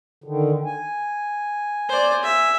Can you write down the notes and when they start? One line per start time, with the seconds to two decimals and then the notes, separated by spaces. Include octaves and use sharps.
0.24 D3 D#3
0.66 G#5
1.89 C5 D5
2.23 E5